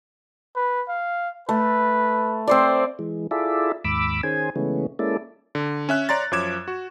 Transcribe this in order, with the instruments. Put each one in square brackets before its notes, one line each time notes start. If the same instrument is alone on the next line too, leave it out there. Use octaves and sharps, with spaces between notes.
[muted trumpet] B4
F5
[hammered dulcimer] A3 [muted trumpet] B4
[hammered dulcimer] C4 C5 D5
[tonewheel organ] E3 G#3
E4 F4 G#4 A4 D5 E5
D#2 G#2 B5 D6 E6
D#3 C#4 G#4 C5 G#5
C#3 E3 G#3 A3 B3 C#4
G#3 A#3 C#4 E4 A4 D5
[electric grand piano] D3
C#4 E5 F#6
C#5 D5 A#5 C6 A6
F#2 F3 C#5 D6 G#6 E7
F#4